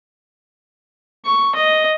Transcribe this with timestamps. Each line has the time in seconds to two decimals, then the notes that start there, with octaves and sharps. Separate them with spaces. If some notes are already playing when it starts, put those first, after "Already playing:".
1.25 C#6
1.56 D#5